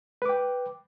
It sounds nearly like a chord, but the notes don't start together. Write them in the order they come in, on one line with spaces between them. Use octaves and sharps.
B4 D6 G5